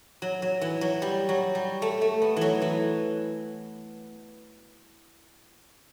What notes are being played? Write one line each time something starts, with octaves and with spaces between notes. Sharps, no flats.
F#3
F#3
E3
F#3
G3
F#3
G3
A3
A3
B3
E3 F#3
E3